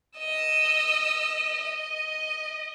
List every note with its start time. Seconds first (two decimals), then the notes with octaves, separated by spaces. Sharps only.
0.18 D#5 E6
1.63 D#5